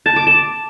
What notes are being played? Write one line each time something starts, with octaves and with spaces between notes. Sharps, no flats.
A5
D6
A5